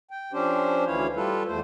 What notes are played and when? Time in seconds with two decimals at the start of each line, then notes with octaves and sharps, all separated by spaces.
0.11 G5
0.33 F3 C#4 D4 G4 C5
0.87 D2 E3 E4 C#5 F5
1.16 G3 F4 A4 B4
1.47 E2 A3 C5